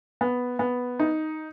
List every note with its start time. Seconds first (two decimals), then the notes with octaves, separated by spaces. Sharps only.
0.21 B3
0.59 B3
0.99 D#4